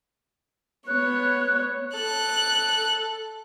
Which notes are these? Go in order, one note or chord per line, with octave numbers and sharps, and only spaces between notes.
B3 C#5 F#6
A4 F#6